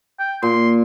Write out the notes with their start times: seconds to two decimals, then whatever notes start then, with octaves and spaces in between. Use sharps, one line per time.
0.20 G5
0.43 A#2 C6